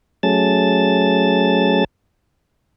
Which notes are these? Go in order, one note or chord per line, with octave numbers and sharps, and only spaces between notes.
F#3 A3 C#4 G#4 A5 A6